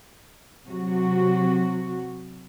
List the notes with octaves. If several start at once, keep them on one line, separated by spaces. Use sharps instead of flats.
C3 F#3 F#4